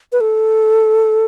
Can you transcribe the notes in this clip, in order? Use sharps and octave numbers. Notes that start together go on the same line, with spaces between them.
B4
A4